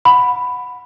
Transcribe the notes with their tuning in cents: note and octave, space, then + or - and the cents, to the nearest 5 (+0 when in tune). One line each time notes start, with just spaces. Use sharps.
F#5 -20 B5 +10